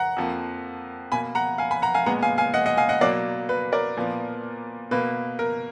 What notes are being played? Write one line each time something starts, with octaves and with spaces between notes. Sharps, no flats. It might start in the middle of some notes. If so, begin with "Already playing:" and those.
Already playing: F#5 A#5
F2 F3 A#3
B2 A#3 G#5 B5
F#5 A#5
F5 G#5
G#5 B5
F#5 A#5
F5 G#5
A#2 G#3 B3 F#5 A#5
F5 G#5
F5 G#5
D#5 F#5
D#5 F#5
F5 G#5
D#5 F#5
B2 F#3 A#3 D5 F5
B4
A#4 D5
A#2 F3 B3
B2 A#3 B4
A#4